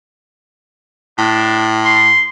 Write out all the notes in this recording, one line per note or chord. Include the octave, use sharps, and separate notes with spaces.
A2 D4
C6